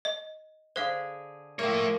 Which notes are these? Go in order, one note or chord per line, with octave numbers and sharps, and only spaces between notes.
D#5
D3 G#4 C5 F5
F3 A3 A#3 C#5